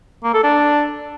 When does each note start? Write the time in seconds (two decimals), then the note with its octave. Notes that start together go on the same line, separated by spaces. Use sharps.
0.24 A#3
0.34 A4
0.44 D4